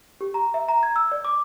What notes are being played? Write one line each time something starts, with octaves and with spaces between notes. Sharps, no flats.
G4
A#5
E5
A#5
G#6
E6
D5
D6